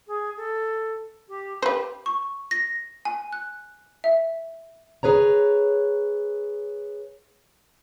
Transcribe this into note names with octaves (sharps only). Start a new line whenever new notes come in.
G#4
A4
G4
G4 B4 C5
C#6
A#6
G#5
F#6
E5
G#4 B4 C#5 A#5